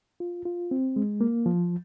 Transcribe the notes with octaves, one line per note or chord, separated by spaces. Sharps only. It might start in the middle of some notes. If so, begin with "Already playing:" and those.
F4
F4
C4
G#3
A#3
F3